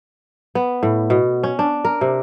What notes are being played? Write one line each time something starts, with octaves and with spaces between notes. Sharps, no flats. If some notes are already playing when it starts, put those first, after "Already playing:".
B3
A2
B2
C#4
D4
A#4
C3